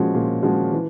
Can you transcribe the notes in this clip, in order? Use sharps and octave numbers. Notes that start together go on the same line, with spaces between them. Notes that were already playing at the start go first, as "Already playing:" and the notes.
Already playing: A#2 F3 G#3 C#4 F#4
A#2
F3 G#3 C#4 F#4
E3